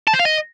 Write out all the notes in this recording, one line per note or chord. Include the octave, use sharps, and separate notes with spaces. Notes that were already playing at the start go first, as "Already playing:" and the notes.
A5
C5
F5
D#5